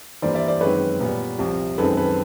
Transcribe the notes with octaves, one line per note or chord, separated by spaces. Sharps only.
G2 E3 G3 A#3 C5 D5
D5 E5
C5 D5
F#2 D#3 G#3 C4 B4 C#5
A#2 G3 B3
C2 C3 F3
F#2 D#3 G#3 C4 A4 B4
A4 B4